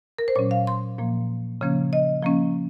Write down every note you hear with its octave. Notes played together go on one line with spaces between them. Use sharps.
A#4
C5
A#2 F#3 C#4 C#5
F5
C6
A#2 F3 A#3
C#3 F3 A#3 C#4
D#5
F3 A#3 C#4